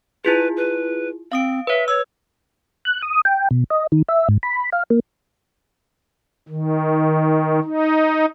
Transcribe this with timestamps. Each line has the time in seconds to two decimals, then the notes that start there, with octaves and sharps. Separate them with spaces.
0.25 E4 F4 G#4 B4
0.57 B4
1.32 C4 F5 D#6 D7
1.67 B4 C#5 E5
1.88 C#5 E6
2.85 F#6
3.02 D#6
3.25 G5
3.51 B2
3.70 D#5
3.92 D#3
4.09 E5
4.29 G#2
4.43 B5
4.73 F5
4.90 A#3
6.49 D#3
7.64 D#4